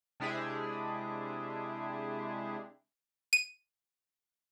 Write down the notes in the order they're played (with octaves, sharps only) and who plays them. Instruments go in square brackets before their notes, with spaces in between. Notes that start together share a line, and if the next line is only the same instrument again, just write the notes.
[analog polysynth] C3 G#3 D4 E4 G4 G#4
[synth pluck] D#7